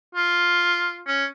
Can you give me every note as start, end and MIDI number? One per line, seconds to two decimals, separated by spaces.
0.15 1.00 65
1.07 1.25 61